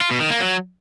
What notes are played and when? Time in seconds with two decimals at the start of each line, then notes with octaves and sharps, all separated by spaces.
0.01 F4
0.11 B2
0.21 D#3
0.30 A#3
0.40 F#3